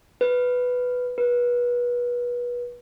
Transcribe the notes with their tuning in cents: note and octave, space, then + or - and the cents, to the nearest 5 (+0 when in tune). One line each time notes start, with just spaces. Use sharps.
B4 +5
B4 -30